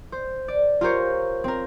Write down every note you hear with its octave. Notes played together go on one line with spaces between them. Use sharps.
C5
D5
F4 G4 A#4 C5 C#5
C4 A#4